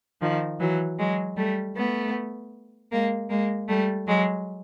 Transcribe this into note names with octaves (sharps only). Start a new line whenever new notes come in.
D#3 F3
E3 F#3
F#3 G#3
G3 A3
A3 B3
G#3 A#3
G#3 A#3
G3 A3
F#3 G#3